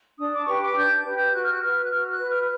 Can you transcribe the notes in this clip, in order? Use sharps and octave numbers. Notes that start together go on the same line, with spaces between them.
D4 D#6
D6
G4 B4 C#6
D6
D4 G6
G4 B4
G6
F#4 F#6
F6
F#6
B4 F6
F#6
F#4 F6
F6
F#6
B4
F6